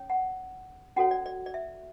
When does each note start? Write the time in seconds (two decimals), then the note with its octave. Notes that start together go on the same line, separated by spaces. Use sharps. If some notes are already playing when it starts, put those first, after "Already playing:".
Already playing: C#4 C#5
0.10 F#5
0.96 C#4 F#4 A4 C#5 F#5
1.11 D5
1.26 D5
1.46 D5
1.54 E5